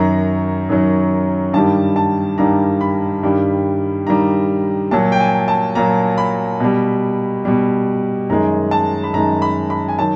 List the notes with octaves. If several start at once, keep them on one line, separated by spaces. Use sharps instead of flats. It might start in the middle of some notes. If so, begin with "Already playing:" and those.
Already playing: F#2 D#3 F#3 A#5
F#2 D#3 F#3
G2 D#3 G3 A5
A5
G2 D#3 G3 A#5
B5
G2 D#3 G3
G2 D#3 G3 A#5
A#2 F#3 A5
G5
G#5
A5
A#2 F#3 A#5
B5
B2 G3
B2 G3
F#2 D#3 G#3 A#5
A5
B5
F#2 D#3 G#3 A#5
B5
B5
G#5
D#3 F#3 A5